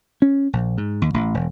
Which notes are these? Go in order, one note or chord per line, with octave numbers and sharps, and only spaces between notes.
C#4
A#1
G#2
D#2
A1
E1